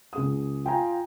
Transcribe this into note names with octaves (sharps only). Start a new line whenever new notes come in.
C#2 G#4 D#6
F4 G5 G#5 A#5